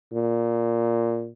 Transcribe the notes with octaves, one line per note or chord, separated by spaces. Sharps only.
A#2